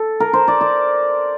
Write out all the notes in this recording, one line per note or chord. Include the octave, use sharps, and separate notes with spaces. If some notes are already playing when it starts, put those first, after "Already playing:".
Already playing: A4
A#4
C5
D5
D5